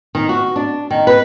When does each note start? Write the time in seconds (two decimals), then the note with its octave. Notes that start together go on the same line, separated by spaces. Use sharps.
0.15 D#3
0.29 F#4
0.56 D4
0.91 D#3
1.07 B4